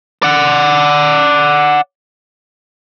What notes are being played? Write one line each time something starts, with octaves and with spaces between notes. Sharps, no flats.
D5 F#5